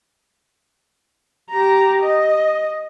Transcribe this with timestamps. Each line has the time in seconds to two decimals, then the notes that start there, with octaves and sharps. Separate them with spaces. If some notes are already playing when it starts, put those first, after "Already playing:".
1.50 G4 A#5
2.03 D#5